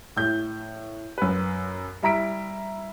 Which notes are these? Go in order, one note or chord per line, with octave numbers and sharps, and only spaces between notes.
A2 G6
F#2 B4
G3 E4 A#5 B6 D7